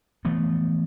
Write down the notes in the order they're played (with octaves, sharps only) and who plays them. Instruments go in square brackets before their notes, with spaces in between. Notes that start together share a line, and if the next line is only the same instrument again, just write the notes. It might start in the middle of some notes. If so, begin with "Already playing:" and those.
[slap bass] E3 F3 A3 B3